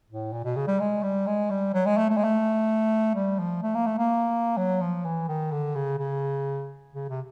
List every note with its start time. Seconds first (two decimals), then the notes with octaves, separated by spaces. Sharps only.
0.09 A2
0.32 A#2
0.44 B2
0.56 C#3
0.67 G3
0.79 G#3
1.03 G3
1.27 G#3
1.50 G3
1.74 F#3
1.86 G#3
1.97 A3
2.09 A3
2.17 G#3
2.24 A3
3.15 G3
3.39 F3
3.63 A3
3.74 A#3
3.86 A3
3.98 A#3
4.57 F#3
4.81 F3
5.04 E3
5.28 D#3
5.51 D3
5.75 C#3
5.99 C#3
6.93 C#3
7.09 C3